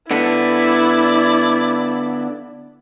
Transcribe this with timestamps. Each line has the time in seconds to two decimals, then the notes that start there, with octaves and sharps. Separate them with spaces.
0.11 D3 B3 E4 D5